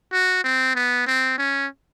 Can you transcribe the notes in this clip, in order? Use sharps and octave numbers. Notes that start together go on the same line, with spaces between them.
F#4
C4
B3
C4
C#4